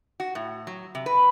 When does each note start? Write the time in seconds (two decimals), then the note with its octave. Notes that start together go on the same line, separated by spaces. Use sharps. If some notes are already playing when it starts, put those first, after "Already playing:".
0.20 F#4
0.35 A2
0.67 F#3
0.95 C3
1.06 B4